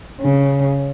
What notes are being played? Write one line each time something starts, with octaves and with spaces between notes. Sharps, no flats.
C#3